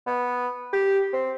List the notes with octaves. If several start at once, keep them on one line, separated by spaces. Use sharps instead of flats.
B3
G4
C4